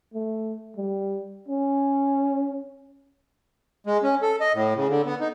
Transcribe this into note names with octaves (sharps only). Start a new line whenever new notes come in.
A3
G3
C#4
G#3
C#4
A4
D#5
A2
C#3
D3
B3
D#4